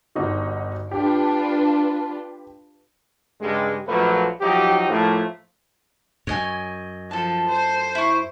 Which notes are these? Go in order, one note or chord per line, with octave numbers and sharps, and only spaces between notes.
G1 D#4 F#4
D4 F4 G4 B4
G2 C#3 G3 G#3
A#1 F3 F#3 A3 A#3 B4
F3 F#3 D#4 G4
A2 F3 A3 A#3
F#2 C#5 D#5 G#5
F3 A4 A5
C5
E4 C#6